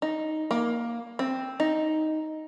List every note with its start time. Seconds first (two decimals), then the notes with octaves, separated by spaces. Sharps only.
0.02 D#4
0.51 A#3
1.19 C4
1.60 D#4